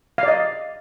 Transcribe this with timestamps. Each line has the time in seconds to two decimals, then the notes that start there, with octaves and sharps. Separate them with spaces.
0.18 F5
0.23 D5
0.28 D#5